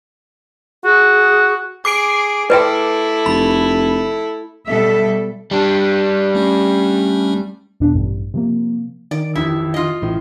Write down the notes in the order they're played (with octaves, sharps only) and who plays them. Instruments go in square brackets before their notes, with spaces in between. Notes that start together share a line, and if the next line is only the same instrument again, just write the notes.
[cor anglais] F#4 [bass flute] G#4
[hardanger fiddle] G#4 [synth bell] D6 C7 D7
[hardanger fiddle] A3 E4 [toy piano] B4 E5 G5
[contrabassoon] F1 [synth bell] B5
[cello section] B2 G3 A4 E5
[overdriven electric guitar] G3 D4
[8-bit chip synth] A3 C#4
[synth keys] G#1 E2 B2 D4
A1 G2
C3 F3 A#3
[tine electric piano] D#3 [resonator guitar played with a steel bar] D5
[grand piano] A1 F2 A2 [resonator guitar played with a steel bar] E4
[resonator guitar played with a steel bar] F4 D#5
[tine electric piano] A1 [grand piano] A2